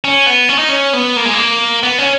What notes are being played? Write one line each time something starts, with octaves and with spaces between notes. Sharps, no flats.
C#4
B3
C#4
D#4
C#4
B3
A#3
G#3
A#3
B3
C#4